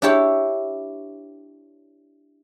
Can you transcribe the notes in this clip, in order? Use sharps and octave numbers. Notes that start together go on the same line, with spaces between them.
D4 E4 G4 C#5